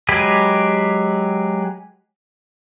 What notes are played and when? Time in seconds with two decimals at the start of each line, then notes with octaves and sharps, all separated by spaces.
0.09 F#3 G#3 G4 B4 G#5